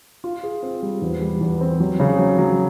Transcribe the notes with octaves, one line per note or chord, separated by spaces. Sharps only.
F4
G#4
C4
G3
E2
G3
E2
C4
F#3
C#3
F#3
F#3